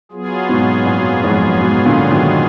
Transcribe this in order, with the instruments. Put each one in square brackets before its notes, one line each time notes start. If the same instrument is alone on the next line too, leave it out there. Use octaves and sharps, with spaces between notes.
[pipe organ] F#3 B3 F4 G#4
[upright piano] G#2 B2
F#2 A#2
F2 G#2
G#2 B2
A#2 D3
B2 D#3